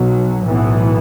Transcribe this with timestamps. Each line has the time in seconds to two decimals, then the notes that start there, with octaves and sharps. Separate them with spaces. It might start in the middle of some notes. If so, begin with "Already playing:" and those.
Already playing: B1 B2 F#3
0.45 B1 A2 E3 B3